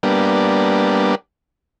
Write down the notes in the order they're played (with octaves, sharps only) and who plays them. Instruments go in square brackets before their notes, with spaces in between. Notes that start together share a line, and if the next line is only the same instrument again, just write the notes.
[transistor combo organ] G3 A#3 B3 D4